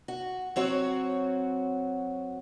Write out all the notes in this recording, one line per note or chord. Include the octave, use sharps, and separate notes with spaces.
F#4
F#3 C4 F#4 C#5